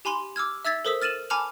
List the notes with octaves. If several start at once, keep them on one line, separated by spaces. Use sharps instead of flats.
G4 G#5 B5 C6 F#7
D6 E6 F6 G#6
E5 E6 G#6 A6 B6
A4 A#4 C5 D#6 E6 B6
F6 A6 D#7 E7 F#7
G#5 A5 B5 D6 F6 F7